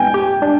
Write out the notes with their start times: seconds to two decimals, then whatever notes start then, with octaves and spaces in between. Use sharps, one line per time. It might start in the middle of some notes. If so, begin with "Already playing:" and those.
Already playing: B3 G5 G#5
0.14 G4
0.42 D4